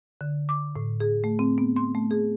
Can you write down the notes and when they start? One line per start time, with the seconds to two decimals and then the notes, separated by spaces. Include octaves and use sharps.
0.21 D3
0.49 D6
0.76 A2
1.00 G#4
1.24 A3
1.39 C4
1.58 B3
1.76 C6
1.95 A3
2.11 G#4